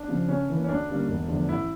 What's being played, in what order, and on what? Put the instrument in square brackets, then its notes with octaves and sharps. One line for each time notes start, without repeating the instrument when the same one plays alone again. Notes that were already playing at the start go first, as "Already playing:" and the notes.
Already playing: [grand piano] D4
[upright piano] C#3 F3
[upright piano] C#3 [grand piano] C#4
[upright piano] E3 A#3
[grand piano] C#4
[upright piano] D2 [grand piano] D4
[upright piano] D3 G3 A#3 C#4
E1
E2 D3 F3 A3
[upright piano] A1 [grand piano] E4